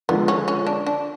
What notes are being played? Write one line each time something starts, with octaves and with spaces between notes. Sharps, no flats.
D3 F3 G#3 B3
C#4
C#4
D4
D4